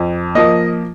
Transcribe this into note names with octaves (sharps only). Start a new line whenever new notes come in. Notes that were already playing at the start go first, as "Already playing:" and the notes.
Already playing: F2
F3 A#3 D#5